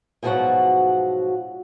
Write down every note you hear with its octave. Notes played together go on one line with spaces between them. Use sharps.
G#2 B2 F3 F#3 F#4 F#5